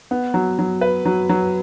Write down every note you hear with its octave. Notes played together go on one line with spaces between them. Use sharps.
B3
F#3
F#3
B4
F#3
F#3